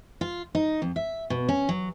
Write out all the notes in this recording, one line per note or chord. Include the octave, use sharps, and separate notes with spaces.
F4
D#4
F2
E5
B2
C#4
F#3